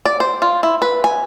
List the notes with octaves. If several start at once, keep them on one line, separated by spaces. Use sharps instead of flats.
D5
C5
F4
E4
B4
G#5